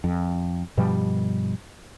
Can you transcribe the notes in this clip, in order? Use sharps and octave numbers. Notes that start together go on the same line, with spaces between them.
F2
G2 B2 F3 G3